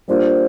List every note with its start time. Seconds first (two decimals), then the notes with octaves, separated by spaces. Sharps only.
0.08 G3 A#3 D4 F4 C5